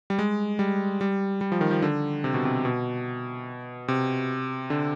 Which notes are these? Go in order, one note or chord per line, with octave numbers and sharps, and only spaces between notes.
G3
G#3
G3
G3
G3
F3
D#3
F3
D3
C3
B2
C3
B2
C3
D3